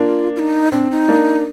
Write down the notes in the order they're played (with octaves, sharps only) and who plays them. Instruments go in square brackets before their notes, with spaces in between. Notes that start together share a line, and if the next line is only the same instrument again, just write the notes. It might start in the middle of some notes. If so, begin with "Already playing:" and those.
Already playing: [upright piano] A#3 D4 [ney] F4
[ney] F4
D#4
[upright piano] C4 [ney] D4
[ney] D#4
[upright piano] A#3 D4